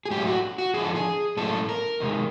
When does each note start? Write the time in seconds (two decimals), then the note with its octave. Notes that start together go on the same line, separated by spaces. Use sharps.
0.06 G#4
0.11 A2 F#3 A3 G4
0.27 F#4
0.58 F#4
0.74 F2 D3 F3 G#4
0.85 A4
0.95 G#4
1.37 A2 F#3 A#3 C#4 E4 A4
1.69 A#4
2.00 E2 C3 D#3 G#3